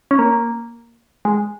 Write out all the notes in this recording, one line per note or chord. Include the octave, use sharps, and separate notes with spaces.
C#4
A#3
G#3